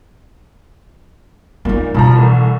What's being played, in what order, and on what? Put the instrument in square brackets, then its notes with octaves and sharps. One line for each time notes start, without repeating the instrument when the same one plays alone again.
[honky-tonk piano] A#2 [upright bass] B3 D#4
[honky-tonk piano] G2 F3 A#5 [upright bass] B2
[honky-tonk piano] C2 A2 E3